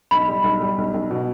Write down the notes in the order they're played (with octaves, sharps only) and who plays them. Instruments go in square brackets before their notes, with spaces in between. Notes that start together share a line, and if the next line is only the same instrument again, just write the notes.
[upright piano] B1 [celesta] B5
[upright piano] G3
B1
G3
B1
B1
B2